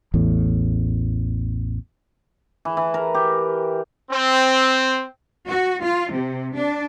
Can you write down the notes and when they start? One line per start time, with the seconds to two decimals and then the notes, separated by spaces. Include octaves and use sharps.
0.14 A1 E2 A2
2.65 E3
2.77 E3
2.94 A#4
3.15 G4
4.10 C4
5.46 F#4
5.81 F4
6.10 C3
6.55 D4